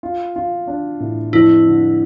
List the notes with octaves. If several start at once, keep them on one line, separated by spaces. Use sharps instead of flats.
F4
F4
D4
A2
F2 E4
D3